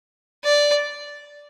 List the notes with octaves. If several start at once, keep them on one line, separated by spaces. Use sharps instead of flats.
D5